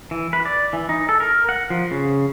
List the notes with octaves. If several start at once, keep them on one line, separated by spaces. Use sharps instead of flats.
E3
B4
D5
E3
D#4
A4
A#4
F#5
F3
C#3